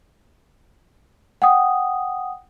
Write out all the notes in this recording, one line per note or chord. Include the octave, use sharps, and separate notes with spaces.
F#5 G5 D#6